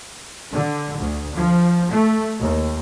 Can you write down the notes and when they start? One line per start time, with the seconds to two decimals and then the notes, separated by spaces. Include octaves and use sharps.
0.52 D3
0.98 D2
1.35 F3
1.91 A3
2.39 D#2